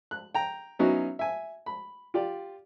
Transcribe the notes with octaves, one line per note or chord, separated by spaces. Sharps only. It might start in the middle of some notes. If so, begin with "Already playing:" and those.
F#6
G5 A#5
F#3 B3 C#4 D#4 E4 F#4
E5 G#5
B5
F4 G4 D5